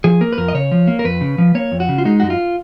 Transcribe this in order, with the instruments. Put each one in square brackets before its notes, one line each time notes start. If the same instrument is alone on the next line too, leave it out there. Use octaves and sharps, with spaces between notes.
[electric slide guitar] F3 G#4
A#3 A#4
B4
F2 A#4
D#5
C#3 C#5
F3
A#3
A#4
F2 B4
C#3
F3
A#3 C#5
F2
F#4
C#3
F4
G#3 D#4
F#2 F#4
F4